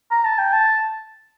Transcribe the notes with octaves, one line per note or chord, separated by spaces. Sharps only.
A#5
A5
G5
A5